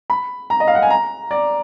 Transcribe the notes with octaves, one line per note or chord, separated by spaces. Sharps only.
B5
A#5
D#5
F5
F#5
G#5
A#5
D5